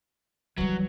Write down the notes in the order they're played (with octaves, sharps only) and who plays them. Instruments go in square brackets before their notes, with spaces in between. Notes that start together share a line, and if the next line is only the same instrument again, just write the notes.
[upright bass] E3 G3 [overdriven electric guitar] F#3